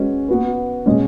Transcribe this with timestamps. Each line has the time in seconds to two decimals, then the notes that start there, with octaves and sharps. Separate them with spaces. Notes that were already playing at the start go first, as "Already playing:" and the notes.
Already playing: G#3 C#4 F#4 B4
0.28 B3 F#4 B4
0.86 B2 G#3 C#4